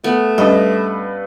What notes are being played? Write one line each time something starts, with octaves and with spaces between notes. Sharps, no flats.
A3 B3
G2 G3 C#4 B4 D#5